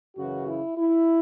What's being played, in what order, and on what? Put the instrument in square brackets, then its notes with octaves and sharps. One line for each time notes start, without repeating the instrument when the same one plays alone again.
[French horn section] F#2 C#3 E3 F#4
E4
E4